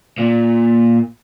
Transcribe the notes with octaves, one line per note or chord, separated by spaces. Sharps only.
A#2